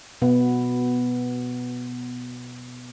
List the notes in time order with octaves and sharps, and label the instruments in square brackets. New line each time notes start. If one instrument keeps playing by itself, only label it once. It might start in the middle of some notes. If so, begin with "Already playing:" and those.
[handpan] B2 B3